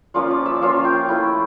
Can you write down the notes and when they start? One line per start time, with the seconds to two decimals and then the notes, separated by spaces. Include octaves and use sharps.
0.14 F3 A#3 C#4 F4 D5
0.31 D5
0.46 E5
0.61 F3 A#3 C#4 F4 F5
0.85 G5
1.09 A3 E4